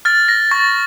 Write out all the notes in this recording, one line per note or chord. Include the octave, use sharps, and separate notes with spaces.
F6 A6
A#6
C#6 A6